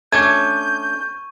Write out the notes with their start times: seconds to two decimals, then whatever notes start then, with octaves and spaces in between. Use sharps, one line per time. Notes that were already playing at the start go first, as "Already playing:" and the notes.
0.12 A3 C#4 D4 C#6 G6 G#6 D#7